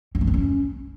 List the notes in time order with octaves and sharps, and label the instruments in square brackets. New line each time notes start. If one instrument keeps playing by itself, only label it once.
[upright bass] C#4
B3
C4
C#4